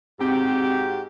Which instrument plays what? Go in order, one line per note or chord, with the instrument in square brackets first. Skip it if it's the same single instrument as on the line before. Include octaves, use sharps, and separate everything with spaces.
[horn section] G#2 F#4 G4 [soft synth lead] C4